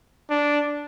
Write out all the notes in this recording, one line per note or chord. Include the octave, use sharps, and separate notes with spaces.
D4